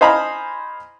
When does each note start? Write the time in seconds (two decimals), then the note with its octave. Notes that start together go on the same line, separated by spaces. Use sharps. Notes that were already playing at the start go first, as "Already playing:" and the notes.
0.01 C5 D#5 F5 G#5 A#5 B5